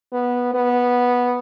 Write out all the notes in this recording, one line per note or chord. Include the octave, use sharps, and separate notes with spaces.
B3
B3